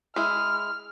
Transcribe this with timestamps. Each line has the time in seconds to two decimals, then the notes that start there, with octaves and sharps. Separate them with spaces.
0.16 G#3 E4 F6